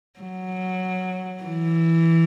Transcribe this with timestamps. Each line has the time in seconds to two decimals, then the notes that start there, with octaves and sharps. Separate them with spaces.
0.20 F#3
1.44 E3